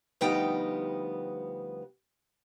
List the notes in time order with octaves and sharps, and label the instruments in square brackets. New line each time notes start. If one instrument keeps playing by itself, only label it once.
[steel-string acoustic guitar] D2 F3 G3 B3 D#4 G5